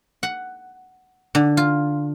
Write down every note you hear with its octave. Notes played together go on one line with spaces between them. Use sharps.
F#5
D3
F4